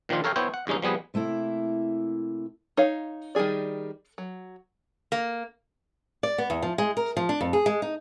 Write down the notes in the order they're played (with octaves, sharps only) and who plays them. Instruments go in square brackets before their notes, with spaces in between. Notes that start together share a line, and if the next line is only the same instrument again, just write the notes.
[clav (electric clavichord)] A#2 D#3 F3 D4 F4
A4 A#4 C#5 F5 G5
B3 E4 C5 C#5 G5
F#5
E2 G2 G#3 C#4 D#4
F3 G3 B3 G#4 B4
[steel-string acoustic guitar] C3 A3 A#3 E4
[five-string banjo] D#4 C#5 F5
D#3 G3 G#3 G#4 D5
F#3
[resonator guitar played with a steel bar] A#3
[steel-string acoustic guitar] D5
B3
E2
F3
G#3
A#4
F3
D4
F2
G#4
G#3
D#4